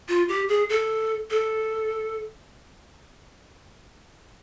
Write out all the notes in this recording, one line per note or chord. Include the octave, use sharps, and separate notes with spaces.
F4
G4
G#4
A4
A4